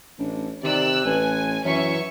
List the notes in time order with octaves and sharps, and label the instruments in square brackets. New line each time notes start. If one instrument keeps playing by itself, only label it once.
[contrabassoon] A1 [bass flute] D4
[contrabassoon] C3 [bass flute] D#3 [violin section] D5 E6 F#6
[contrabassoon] A1 [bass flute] B4 [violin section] G#5
[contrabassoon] F#2 [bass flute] E3 [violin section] C#4 E5 C#6